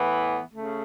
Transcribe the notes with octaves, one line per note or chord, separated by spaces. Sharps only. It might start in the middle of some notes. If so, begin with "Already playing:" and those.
Already playing: A2 E3 B3
C#3 A3